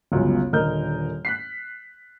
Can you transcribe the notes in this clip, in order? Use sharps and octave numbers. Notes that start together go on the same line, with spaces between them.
G1 C#2 F#2 B2
D#1 D3 A#4 D#5 F6 G6
F#6 B6 C7